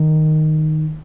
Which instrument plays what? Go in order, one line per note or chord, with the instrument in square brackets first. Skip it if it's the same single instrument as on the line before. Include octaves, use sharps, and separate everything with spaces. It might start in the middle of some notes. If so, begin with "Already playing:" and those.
Already playing: [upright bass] D#3